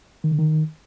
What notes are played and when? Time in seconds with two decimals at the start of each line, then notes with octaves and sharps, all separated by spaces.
0.24 D#3
0.31 D3
0.39 D#3